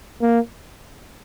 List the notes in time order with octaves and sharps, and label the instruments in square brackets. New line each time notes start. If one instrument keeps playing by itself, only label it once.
[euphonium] A#3